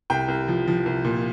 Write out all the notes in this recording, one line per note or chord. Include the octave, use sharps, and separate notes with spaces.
C2 G5
C2
F3
F3
C2
A#2